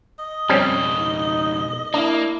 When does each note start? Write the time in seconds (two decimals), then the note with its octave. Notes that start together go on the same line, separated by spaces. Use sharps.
0.19 D#5
0.49 F2 B2 G3 C4 C#4
1.00 D#4
1.94 A#3 D4 E4